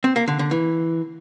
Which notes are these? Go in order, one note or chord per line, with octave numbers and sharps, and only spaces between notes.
C4
A#3
D3
D3
E3